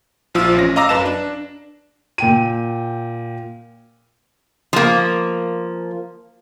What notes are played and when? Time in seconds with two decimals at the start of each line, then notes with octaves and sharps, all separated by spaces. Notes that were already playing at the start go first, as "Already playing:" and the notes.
0.34 A#1 F3 F4 E6
0.55 A1 C#4 A#6
0.76 D#5 F5 A#5 D6 E6 A#6
0.89 F#2 B4 A5 E7
1.05 D4
2.18 A#2 G5 D#7
4.73 F3 A#3